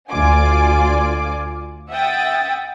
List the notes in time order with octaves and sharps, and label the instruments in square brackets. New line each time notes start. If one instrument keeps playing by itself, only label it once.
[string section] D2 F4 D5 G#5 D6
E5 F#5 G5 D#6 A6